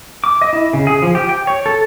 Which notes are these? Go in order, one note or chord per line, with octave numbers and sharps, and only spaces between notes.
D6
D#5
E4
C#3
G#4
F3
G4
G5
C#5
A4